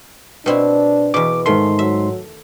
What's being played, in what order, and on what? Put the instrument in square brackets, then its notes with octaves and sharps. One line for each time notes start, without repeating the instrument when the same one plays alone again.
[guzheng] B2 C4 E4 [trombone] D4
[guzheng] E2 B2 [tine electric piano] D6
[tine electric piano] G#2 C6 [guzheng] D#3 A3
[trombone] F#3 [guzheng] E5